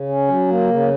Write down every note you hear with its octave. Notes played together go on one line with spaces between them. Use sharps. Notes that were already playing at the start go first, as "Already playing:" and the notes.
Already playing: C#3
C#4
F#3
A#3
C#3